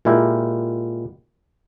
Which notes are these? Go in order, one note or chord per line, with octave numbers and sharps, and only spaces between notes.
A#2 G#3 E4 G4 A#4